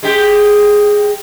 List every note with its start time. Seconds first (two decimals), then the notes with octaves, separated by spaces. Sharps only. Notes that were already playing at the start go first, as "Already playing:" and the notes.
0.03 G#3 G4